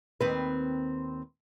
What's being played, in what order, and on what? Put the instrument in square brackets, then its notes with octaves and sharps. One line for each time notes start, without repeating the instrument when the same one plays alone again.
[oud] D#2 C4 B4